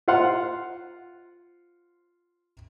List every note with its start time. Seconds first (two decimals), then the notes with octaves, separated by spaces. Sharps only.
0.08 F4 C5 F5 F#5 C6